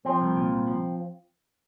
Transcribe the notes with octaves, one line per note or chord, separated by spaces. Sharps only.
F3 C4
C2
A#2
C2
F3